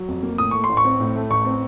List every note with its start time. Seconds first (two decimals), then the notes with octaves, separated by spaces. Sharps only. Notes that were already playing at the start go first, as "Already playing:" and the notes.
Already playing: F#3
0.08 F2
0.23 A#3
0.38 A2 D#6
0.51 A3 C#6
0.64 C6
0.69 A1
0.77 C#6
0.85 C4
1.00 A2
1.16 A3
1.30 A1 C#6
1.45 C4